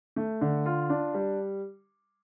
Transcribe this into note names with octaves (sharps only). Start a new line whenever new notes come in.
A3
D3
F4
D4
G3